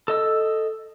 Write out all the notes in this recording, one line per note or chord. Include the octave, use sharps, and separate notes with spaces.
A4 D#5 E6